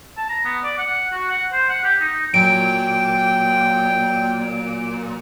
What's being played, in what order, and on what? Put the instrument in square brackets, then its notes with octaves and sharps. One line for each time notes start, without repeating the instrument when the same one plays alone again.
[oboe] A5
A#5
B3
D5
F#5
F#4
F#5
C5
F#5
G4
D#4
[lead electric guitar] A#2 [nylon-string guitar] F#3 [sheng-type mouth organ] G5 [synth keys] D7